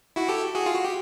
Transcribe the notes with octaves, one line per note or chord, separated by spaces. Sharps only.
E4 F#4
G4 A4
F#4 G#4
F4
F#4
G4